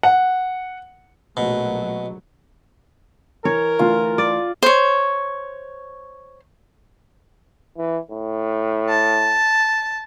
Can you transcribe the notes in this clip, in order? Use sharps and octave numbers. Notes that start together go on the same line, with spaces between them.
F#5
A#1 B2 F#3 A3
E3 A#4 C#5
D2 E3 F4
D5
C5 C#5
E3
A2
A5